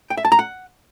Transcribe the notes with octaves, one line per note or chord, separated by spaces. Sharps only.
G5
E5
A5
A#5
F#5